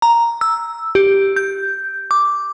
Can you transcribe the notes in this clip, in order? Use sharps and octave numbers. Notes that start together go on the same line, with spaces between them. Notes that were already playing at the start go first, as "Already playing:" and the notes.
A#5
E6
G4
G6
D6